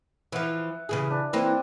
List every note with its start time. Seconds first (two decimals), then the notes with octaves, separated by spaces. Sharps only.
0.32 E3 F3 E5 F#5
0.89 C#3 E3 G#4
1.11 D4
1.33 E3 A#3 C4 E4